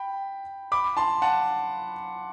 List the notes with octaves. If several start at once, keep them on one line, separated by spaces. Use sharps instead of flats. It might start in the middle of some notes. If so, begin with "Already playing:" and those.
Already playing: G5 B5
B5 D6
A5 C6
F#5 A5